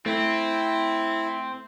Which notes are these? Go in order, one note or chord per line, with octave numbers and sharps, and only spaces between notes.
A3 C4 E4